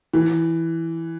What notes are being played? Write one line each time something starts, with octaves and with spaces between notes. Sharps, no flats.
E3